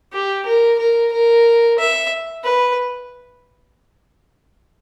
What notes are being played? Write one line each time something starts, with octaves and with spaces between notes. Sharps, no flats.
G4
A#4
A#4
A#4
E5
B4